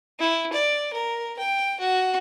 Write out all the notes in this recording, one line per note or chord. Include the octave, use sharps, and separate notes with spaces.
E4
D5
A#4
G5
F#4